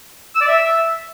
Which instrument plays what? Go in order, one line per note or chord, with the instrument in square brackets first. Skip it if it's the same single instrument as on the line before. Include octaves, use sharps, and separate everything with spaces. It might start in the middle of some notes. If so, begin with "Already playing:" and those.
[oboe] E6
D5
E5